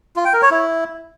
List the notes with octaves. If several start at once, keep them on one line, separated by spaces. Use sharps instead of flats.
F4
G5
A#4
C#5
E4